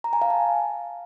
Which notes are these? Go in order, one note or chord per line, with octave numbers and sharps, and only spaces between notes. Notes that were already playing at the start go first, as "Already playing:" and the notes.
A#5
G#5
F5
A5